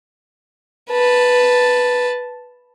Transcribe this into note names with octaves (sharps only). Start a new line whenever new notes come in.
B4 A5